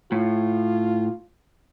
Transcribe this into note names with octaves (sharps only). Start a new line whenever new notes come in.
A2 F4